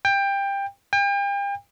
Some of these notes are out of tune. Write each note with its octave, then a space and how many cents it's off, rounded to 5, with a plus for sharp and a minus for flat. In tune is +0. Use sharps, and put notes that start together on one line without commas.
G5 +20
G5 +40